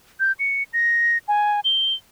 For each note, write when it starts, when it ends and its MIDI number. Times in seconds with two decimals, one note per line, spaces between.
0.20 0.32 91
0.39 0.63 97
0.73 1.18 94
1.28 1.60 80
1.65 1.94 103